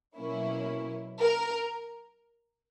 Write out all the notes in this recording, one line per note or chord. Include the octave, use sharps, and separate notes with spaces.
B2 F#3 A#3 C#4 E4
A#4